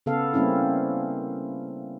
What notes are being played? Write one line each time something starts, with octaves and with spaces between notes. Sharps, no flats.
C#3 B3 A4 F5
G3 A#3 C4 C#4 E4